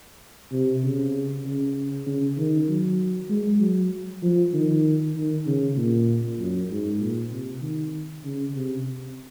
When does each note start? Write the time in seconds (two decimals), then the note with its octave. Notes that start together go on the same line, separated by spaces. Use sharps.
0.52 C3
0.84 C#3
1.45 C#3
2.07 C#3
2.37 D#3
2.69 F#3
3.30 G#3
3.61 F#3
4.22 F3
4.54 D#3
5.16 D#3
5.46 C#3
5.77 A#2
6.39 F#2
6.70 G#2
7.00 A#2
7.31 C3
7.62 D#3
8.24 C#3
8.55 C3